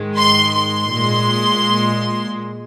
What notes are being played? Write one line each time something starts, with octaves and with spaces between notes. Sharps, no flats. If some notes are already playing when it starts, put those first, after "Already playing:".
Already playing: G#2 D#3 G#3
C6
C6
A#2 G#3